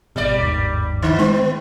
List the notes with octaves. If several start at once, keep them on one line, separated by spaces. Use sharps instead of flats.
G#1 B2 G3 D5
G1 D#2 G#2
D3
G#3 A3 B3